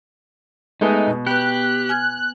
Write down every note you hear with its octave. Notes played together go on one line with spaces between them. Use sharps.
G#3 A3 B3 D#4
B2
B3 G4 B4 F#6
G#5 F6 G#6